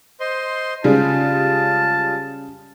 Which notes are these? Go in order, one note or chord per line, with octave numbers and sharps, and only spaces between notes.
C5 D#5 C6
C#3 G3 G#3 F4 A5